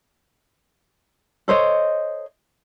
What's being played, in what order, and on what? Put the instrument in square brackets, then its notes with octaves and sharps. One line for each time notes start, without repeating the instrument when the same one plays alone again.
[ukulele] A4 C5 C#5 D#5